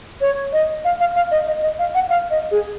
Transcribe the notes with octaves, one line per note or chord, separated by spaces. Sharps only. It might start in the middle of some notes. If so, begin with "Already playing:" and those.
C#5
D#5
F5
F5
F5
D#5
D#5
D#5
F5
F#5
F5
D#5
G#4